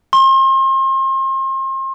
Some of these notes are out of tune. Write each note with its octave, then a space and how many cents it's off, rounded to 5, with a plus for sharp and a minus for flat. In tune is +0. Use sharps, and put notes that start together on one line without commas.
C6 +35